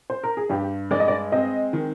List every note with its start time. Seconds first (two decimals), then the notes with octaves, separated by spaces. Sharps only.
0.10 C5
0.24 A#4
0.37 G#4
0.50 G2 G4
0.91 G#3 D5
1.00 D#5
1.08 D5
1.32 C4 D#5
1.73 D#3